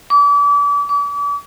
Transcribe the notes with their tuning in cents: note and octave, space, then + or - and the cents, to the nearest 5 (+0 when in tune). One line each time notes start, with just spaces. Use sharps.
D6 -35
D6 -40